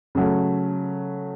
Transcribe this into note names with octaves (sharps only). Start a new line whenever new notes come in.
C#3 F#3 A3